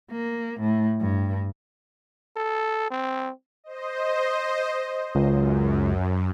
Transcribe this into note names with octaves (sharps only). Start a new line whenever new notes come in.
A#3
A2
G2
A4
C4
C5 D#5
C#2 F#2